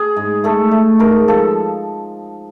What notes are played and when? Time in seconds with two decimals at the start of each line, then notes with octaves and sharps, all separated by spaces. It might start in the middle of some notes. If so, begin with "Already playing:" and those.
Already playing: G#4
0.17 G#2
0.44 A3 A4
0.71 A3
0.99 G#2 A#4
1.28 F3 A4